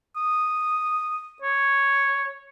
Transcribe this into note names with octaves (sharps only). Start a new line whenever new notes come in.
D#6
C#5